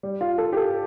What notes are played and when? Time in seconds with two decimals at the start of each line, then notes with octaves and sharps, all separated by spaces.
0.03 G3
0.21 F4
0.38 A4
0.53 G4
0.57 A4